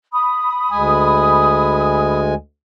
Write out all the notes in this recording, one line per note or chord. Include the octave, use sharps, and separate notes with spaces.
B5 D#6
D2 G#3 G#5